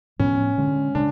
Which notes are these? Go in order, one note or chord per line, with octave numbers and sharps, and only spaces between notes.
A2 F3 B3 C#4 D4
D3 G#3 C#4
C#3 G#3 D4